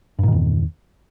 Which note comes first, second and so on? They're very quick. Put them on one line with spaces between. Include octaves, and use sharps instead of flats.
G2 A#2 D#3 E2